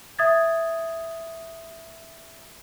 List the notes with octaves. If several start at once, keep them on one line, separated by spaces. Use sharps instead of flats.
E5 D#6 G#6 A6